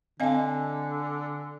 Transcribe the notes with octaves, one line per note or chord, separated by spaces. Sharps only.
D3 C4 D#5 F5 G#5 A5